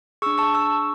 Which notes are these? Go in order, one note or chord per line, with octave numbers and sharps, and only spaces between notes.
D4 G#4 C#6 E6
A5 C#6
C#6 E6